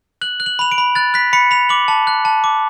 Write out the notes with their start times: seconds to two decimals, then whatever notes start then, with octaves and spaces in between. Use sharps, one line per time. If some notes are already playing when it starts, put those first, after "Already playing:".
0.21 F#6 F#7
0.40 F#6
0.46 F#7
0.59 B5 F7
0.72 D7
0.78 B5
0.95 F#6 A6
1.14 F#6 B6
1.33 B5 C#7
1.51 B5 F7
1.69 D6 F#7
1.88 A5
2.07 F#6
2.25 A5
2.44 D6